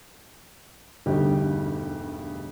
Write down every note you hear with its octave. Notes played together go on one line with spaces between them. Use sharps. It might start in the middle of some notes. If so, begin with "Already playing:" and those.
E1 D2 G2 D3 D#4 G4